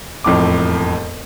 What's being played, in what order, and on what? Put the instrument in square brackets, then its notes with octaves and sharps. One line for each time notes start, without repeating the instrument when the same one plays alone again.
[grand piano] E1 F2 A2 D6